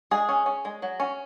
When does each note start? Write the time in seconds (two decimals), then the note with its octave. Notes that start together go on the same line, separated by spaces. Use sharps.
0.11 G#3 G#4
0.29 C#4
0.46 C#4
0.65 G#3
0.82 F#3
1.00 C#4